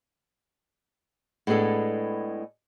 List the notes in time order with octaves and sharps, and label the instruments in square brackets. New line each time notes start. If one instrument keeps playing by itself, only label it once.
[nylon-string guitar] A2 G#3 B3 D4 A4